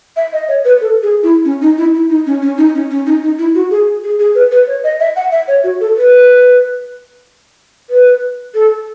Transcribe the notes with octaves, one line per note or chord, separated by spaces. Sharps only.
E5
D#5
C#5
B4
A4
G#4
E4
C#4
D#4
E4
E4
D#4
C#4
C#4
D#4
C#4
C#4
D#4
D#4
E4
F#4
G#4
G#4
G#4
B4
B4
C#5
D#5
E5
F#5
E5
C#5
F#4
A4
B4
B4
A4